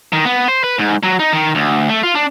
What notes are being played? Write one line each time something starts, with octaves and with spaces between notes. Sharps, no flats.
D#3
B3
C5
B4
G#2
F#3
D#4
D#3
D2
A3
F4
D4